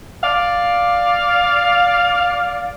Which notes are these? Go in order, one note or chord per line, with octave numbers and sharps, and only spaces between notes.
D5 F5